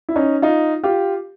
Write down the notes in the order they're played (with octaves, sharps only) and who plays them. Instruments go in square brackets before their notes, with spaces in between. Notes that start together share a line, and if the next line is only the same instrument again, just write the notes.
[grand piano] E4
C#4 D#4
D#4 F4
F4 G4